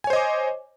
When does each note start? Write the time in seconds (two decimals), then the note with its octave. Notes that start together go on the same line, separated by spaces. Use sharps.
0.04 G#5
0.07 C#5
0.10 C5
0.13 D#5
0.16 D6